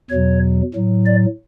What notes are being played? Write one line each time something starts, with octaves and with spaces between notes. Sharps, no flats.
E2 B2 F#3 C#5
A2 F#3
D5